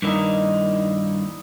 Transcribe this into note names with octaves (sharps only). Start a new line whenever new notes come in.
G2 D#3 A#3 D#4 E4 D5